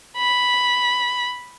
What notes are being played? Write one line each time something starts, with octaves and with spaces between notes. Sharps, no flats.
B5